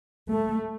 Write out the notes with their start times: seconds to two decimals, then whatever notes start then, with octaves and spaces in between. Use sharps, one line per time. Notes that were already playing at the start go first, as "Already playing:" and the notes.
0.30 A3